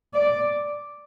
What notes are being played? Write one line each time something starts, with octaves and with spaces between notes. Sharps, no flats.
D5